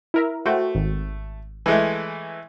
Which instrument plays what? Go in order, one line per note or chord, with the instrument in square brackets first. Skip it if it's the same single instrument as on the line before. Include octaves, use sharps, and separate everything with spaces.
[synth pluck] E4 A#4 E5
[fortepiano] A3 [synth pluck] F#4 C5 G5
[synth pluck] G#1
[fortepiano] E3 G#3 A3